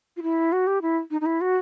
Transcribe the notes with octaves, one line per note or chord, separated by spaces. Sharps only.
F4
E4
F#4
G4
E4
D#4
D#4
E4
F#4